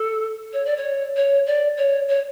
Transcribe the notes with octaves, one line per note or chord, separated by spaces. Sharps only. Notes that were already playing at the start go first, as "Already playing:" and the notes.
Already playing: A4
C#5
D5
C#5
C#5
D5
C#5
C#5